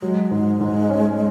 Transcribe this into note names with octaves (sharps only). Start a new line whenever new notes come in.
F#3 G#3
G#2
G#2
C#4